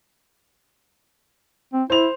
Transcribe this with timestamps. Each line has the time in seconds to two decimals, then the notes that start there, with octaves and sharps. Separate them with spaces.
1.73 C4
1.90 E4 C5 F7